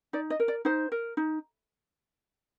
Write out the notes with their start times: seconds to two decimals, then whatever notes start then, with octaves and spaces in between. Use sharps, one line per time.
0.13 D#4 D5
0.30 D#5
0.40 A#4
0.48 D5
0.65 D#4 C5
0.92 A#4
1.17 D#4